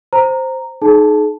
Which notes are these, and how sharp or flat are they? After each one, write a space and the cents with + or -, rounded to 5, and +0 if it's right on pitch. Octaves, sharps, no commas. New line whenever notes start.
C5 +0 A#5 -10
D#4 -15 G#4 +40 A5 +0